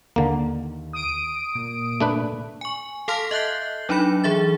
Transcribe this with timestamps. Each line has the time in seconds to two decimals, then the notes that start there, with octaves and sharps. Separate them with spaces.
0.16 D#2 D3 A#3
0.93 D#6 D7
1.55 A#2
2.01 A3 D4 B4
2.61 G#5 C#6
3.08 A4 F5 A5 C6 F6 B6
3.31 D#5 E5 F#6 G6 C7
3.89 F#3 D4 D#4 B5 C#7
4.24 E3 G#4 E5 A6